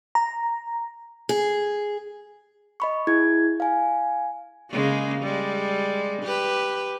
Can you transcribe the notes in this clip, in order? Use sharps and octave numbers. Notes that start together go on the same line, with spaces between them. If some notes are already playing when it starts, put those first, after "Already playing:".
A#5
G#4
D#5 B5 C#6
E4 G#4 G#6
F5 G#5
C#3 G#3 A#3
G3 G#3
G4 B4